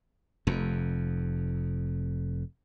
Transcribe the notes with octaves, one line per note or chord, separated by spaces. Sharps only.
F1 F2